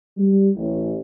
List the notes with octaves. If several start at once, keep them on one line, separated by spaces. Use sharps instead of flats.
G3
A1